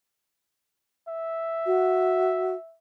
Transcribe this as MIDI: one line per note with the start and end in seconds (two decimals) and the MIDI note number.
1.08 2.78 76
1.66 2.55 66